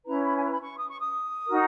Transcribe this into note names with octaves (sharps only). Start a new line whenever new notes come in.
C#4 E4 B4 A#5
B5
G#5
A#5
B5
C#6
D#6
C#6
D#6
D#4 F#4 A#4